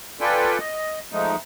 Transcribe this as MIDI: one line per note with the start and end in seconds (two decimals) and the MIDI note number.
0.21 0.58 65
0.21 0.58 69
0.21 0.58 71
0.21 0.58 74
0.21 0.58 79
0.21 0.58 80
0.59 0.99 75
1.12 1.36 53
1.12 1.36 56
1.12 1.36 57
1.12 1.36 63